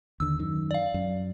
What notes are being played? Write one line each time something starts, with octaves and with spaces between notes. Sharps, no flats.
D#2 D3 E6
F#2 D#3
D5 F5
F#2